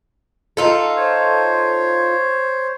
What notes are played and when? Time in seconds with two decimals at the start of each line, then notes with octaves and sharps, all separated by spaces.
0.57 D#4 F4 A4
0.96 C5 C#5